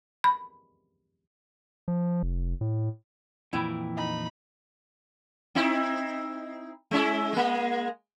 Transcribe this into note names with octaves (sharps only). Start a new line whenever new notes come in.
B5
F3
F1
A2
F2 A#2 E3 E4 G5
D#4 B5
C4 D#4 E4
G#3 C#4 E4
G#3 A#3